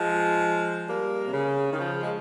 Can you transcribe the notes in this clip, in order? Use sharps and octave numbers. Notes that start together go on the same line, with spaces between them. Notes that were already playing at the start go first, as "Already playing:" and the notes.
Already playing: F3 G#3
G3 A#3
C3
C#3
D#3
C#3 F3
G#3